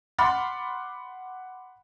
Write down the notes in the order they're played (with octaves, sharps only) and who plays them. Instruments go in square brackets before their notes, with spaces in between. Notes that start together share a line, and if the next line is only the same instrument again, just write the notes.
[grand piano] F#5 B5 C6 D6 F6 A6